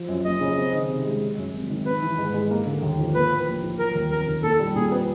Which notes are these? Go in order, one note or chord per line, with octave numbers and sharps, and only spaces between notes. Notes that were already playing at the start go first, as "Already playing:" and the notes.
Already playing: F3
F#2
F#1 D#5
C#3
C4
D#3
C3
G#3
F#3
F#2
G#1
D#3
B3 B4
E3
G#2
G#3
A#3
D3
D#2
F3
A#3 B4
A2
A#1
F3
F#3 A#4
D#2
F1 A#4
D#3
A#2 A4
G3
A#2 G#4
B3